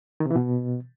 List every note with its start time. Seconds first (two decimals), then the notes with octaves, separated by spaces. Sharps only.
0.20 D#3
0.25 C3
0.31 E3
0.36 B2